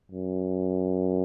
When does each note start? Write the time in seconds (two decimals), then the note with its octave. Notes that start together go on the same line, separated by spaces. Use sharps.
0.11 F#2